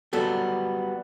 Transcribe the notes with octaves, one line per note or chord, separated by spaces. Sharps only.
F#3 G3 B3 A4